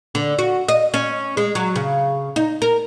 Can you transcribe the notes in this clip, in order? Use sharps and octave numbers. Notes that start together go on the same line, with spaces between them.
D3
F#4
D#5
C#4
G#3
F#3
C#3
D#4
A#4